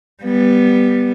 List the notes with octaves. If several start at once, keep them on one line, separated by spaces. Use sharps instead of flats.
G3 B3